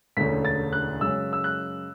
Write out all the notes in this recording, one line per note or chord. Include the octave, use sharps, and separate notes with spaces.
E1 D2 D3 A3 C#4 B6
A6
F#6
F#2 C#3 G#3 C#4 E6
E6
F#6